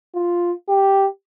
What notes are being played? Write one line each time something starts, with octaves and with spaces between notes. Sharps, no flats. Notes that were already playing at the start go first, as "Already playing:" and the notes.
F4
G4